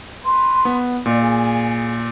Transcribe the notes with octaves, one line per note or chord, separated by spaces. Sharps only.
B4 A#5 C6
B3
A#2 D5 D#5
G#4